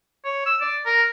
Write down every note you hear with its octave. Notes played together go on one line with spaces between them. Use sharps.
C#5
E6
D5
A#4